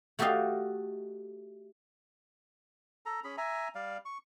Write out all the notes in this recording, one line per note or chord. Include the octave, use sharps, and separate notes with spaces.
A3 F#4 G4 A4 D#5 F5
A4 A#5
C#4 G#4 B5
E5 G#5 A#5
G3 D5 F5
C#6